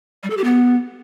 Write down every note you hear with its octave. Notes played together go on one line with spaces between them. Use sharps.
G3
A4
G4
B3